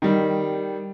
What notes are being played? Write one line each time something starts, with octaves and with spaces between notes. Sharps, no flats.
D#3 G3